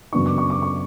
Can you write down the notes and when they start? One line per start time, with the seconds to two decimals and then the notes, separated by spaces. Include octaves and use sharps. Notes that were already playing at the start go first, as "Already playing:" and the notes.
0.13 F#2 C#3 F#3 B3 D4 C#6
0.26 D6
0.38 C#6
0.50 D6
0.62 C#6